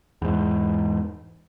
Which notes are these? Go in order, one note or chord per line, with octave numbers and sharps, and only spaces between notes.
E2 G#2